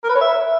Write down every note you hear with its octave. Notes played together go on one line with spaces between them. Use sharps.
A#4
B4
C#5
E5